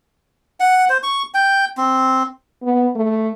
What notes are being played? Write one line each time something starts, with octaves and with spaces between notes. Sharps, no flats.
F#5
C5
C#6
G5
C4
B3
A3